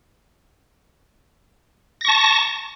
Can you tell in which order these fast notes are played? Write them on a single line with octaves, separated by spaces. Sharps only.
A#6 C#6 A5